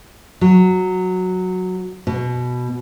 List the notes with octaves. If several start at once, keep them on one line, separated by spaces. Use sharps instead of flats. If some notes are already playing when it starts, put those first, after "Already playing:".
F#3
B2